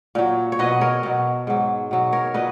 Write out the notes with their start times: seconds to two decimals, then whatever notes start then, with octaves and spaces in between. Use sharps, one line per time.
0.15 A#2 F#3
0.52 C#5
0.59 B2 F#3 B4 D#5
0.81 A#4 C#5
1.03 B2 F#3
1.47 G#2 F#3
1.91 B2 F#3
2.13 A#4 C#5
2.34 A#2 F#3 B4 D#5